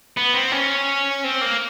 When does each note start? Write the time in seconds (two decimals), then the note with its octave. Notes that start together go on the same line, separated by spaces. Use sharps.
0.17 B3
0.34 C4
0.52 C#4
1.24 C4
1.41 A#3